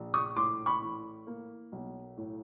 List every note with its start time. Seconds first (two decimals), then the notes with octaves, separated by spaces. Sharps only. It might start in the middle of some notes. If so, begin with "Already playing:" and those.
Already playing: A#1
0.14 C#6 D#6
0.36 A2 C6 D6
0.66 B5 C#6
0.82 E3
1.27 A#3
1.72 B1
2.17 A2